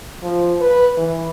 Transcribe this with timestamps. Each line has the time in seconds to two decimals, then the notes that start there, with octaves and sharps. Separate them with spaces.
0.23 F3
0.61 B4
0.97 E3